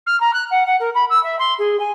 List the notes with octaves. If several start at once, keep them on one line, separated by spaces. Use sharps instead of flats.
F6
A#5
F#6
F#5
F#5
A#4
B5
E6
E5
C6
G#4
G#5